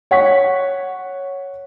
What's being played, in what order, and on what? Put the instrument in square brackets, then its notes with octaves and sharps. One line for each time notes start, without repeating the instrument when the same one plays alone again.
[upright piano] C#5 F#5 C#6 B6